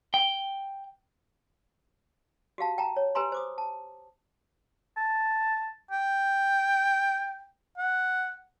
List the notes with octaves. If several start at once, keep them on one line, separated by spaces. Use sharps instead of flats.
G5
F#4 G4 F5 A5
G5 A5 A#5
C#5
G4 B4 G#5 A#5 C6
C5 D6 D#6
A5
A5
G5
F#5